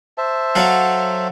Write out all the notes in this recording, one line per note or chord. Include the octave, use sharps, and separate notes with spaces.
C5 E5 A5
F#3 A4 F5